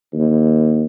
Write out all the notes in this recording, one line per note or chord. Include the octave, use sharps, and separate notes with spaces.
D#2